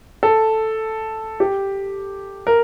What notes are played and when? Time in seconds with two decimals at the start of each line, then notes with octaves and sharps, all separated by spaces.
0.23 A4
1.40 G4
2.47 A#4